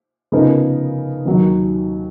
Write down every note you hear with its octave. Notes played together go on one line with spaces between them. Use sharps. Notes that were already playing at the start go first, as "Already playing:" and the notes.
C#3 F3 B3 D#4 A#4
D#2 D#3 F#3